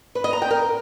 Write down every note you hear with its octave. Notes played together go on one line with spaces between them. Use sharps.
B4
D#5
A#5
G5
A#4